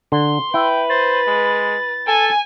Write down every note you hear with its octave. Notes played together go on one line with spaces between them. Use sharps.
D3 C6
E4 B4 G5
C5 A6
G#3
A4 G#5